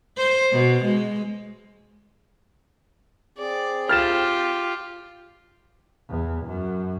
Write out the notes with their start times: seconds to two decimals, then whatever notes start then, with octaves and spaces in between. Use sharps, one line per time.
0.17 C5
0.52 B2
0.85 G#3
3.38 C4 G#4 D5
3.89 F4 G4 F6 A6 E7
6.09 E2
6.45 F#2